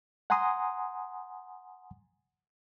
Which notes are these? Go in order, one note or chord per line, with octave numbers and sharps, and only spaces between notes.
F#5 G#5 A#5 C6 D#6